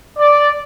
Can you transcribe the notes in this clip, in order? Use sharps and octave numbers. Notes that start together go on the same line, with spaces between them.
D5